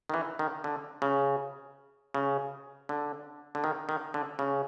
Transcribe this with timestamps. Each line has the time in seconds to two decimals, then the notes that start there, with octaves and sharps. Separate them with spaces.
0.09 D#3
0.14 E3
0.39 D#3
0.64 D3
1.02 C#3
2.14 C#3
2.89 D3
3.55 D3
3.64 D#3
3.89 D#3
4.14 D3
4.39 C#3